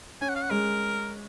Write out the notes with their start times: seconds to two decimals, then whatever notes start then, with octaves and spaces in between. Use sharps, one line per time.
0.21 C#4 G#5
0.29 F#5
0.36 F5
0.43 F#5
0.50 G#3 A#4